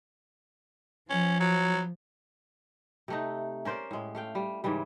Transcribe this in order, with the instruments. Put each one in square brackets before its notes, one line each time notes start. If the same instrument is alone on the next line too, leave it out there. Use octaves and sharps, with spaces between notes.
[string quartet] F3 [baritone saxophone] C#4
[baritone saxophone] F#3
[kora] C3 A3 D#4
C#4 A#4 C5 D5
A2 G#3
A3 F5 G5
G3
G#2 C#3 E3 G3